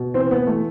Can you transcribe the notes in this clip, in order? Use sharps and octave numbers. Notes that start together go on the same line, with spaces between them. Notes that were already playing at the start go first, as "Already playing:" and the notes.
Already playing: B2
E3 C4
B3
E3
A3